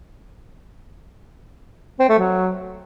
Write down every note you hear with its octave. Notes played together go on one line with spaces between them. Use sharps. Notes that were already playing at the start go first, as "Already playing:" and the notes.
C4
A3
F#3